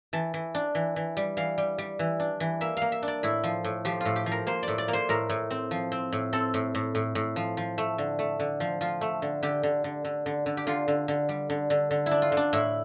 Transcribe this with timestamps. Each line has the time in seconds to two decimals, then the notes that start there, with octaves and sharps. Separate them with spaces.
0.13 E3 A5
0.34 E3
0.55 D4
0.75 E3
0.96 E3
1.17 G3
1.37 E3 F5
1.58 G3
1.78 G3
1.99 E3
2.20 D4
2.40 E3
2.61 A#3 E5
2.77 A#3 F5
2.92 E5
3.03 D4
3.08 D5
3.23 A2 E4
3.44 F3
3.64 A2
3.85 F3 G4
4.01 A2 F4
4.16 G4
4.26 F3
4.32 A#4
4.47 A#3 C5
4.63 D5
4.68 A2
4.78 D5
4.88 A#3
4.93 C5
5.09 A2 A#4
5.30 A2
5.50 C4
5.71 F3
5.92 C4
6.13 A2
6.33 C4 A4
6.54 A2
6.75 A2
6.95 A2
7.15 A2
7.36 F3
7.57 F3
7.78 A3
7.98 D3
8.19 A3
8.40 D3
8.60 F3
8.81 F3 F4
9.01 A3
9.22 D3
9.43 D3 G4
9.63 D3
9.84 D3
10.05 D3
10.26 D3
10.46 D3
10.57 G4
10.67 D3 F4
10.88 D3
11.08 D3
11.29 G3
11.50 D3
11.70 D3
11.91 D3
12.06 E4
12.11 D4
12.22 F4
12.32 D3
12.37 D4
12.53 A2 E4